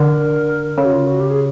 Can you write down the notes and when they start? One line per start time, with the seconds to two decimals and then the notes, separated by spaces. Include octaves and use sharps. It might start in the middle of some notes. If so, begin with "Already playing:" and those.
Already playing: D3 A#4
0.78 C#3 A4
0.85 F#4
0.92 F4
1.07 F#4
1.20 G4
1.30 G#4